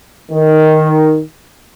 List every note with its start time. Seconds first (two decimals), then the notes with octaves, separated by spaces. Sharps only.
0.31 D#3